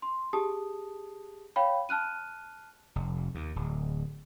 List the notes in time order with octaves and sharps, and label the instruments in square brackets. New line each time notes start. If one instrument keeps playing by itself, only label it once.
[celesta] C6
G4 G#4 A5 D#6
C#5 F5 G5 B5
A5 F6 F#6 D#7
[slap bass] F1
D#2
D1